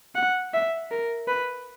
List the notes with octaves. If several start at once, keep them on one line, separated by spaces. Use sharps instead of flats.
F#5
E5
A#4
B4